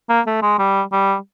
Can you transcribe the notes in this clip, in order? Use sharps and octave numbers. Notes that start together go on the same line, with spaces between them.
A#3
A3
G#3
G3
G3